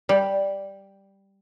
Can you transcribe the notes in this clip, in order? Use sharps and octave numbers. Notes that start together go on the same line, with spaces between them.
G3